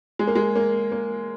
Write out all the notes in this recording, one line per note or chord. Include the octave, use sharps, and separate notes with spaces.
G#3
A#3
G#3
A#3
A#3